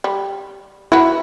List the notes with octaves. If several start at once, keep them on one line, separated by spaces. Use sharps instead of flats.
G3
E3 E4 F#4 B4